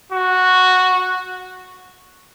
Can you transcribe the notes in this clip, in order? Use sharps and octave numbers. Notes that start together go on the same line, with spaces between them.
F#4